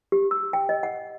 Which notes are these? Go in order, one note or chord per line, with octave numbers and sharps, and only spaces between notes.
G4
E6
G5
D#5
F#5